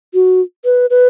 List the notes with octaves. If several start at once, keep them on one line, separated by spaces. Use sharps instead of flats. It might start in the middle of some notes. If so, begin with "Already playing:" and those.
F#4
B4
B4